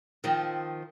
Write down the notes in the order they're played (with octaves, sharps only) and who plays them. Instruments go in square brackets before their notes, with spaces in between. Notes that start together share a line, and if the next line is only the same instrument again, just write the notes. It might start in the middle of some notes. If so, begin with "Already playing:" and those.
[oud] D#3 F3 C4